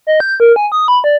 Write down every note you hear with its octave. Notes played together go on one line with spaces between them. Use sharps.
D#5
G6
A#4
G#5
D#6
B5
D5